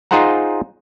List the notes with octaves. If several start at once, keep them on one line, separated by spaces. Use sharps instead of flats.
D#4 F4 G#4 C5 F#5 A#5